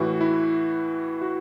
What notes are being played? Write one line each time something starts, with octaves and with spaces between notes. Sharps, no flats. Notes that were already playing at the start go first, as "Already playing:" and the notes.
Already playing: A2 E3 F#4
E4
F#4